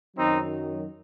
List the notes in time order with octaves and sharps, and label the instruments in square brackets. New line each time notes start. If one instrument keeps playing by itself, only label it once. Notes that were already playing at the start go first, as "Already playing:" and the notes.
[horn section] F#2 D#3 F#3 C4 D#4